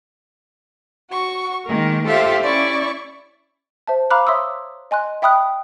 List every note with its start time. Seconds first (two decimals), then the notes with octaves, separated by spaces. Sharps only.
1.10 F#4 C#6
1.66 D#3 G#3 A#3 A#4
2.07 F4 G4 A4 C5 E5 F5
2.43 C#4 E4 D5 C#6
3.87 C5 E5 A5
4.10 F5 A#5 B5 D6 F6 F#6
4.27 C#5 E5 C6 D#6 E6
4.91 D#5 G#5 C6 F#6
5.22 E5 G5 B5 D#6 F6 F#6